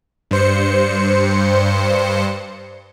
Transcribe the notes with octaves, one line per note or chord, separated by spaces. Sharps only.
G2 C5 C#7